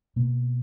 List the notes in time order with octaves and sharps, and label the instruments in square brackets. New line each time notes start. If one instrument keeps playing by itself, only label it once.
[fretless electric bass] B2 A#3